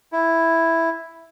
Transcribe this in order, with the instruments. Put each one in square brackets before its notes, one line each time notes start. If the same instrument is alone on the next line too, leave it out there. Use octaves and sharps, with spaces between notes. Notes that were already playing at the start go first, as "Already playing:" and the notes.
[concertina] E4